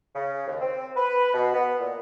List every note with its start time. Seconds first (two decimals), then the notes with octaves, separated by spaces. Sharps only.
0.15 C#3
0.47 D#2
0.61 C4
0.97 B4
1.34 B2
1.54 B3
1.80 A#2